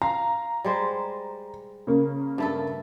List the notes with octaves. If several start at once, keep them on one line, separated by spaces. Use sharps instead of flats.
F5 A#5
G3 G#3 C5
C#3 A#3
G2 A3 A4